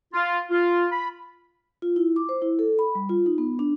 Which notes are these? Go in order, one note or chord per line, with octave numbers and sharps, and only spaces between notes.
F4
F4
B5
F4
E4
D6
C5
E4
A4
B5
G3
F4
D#4
B3
D4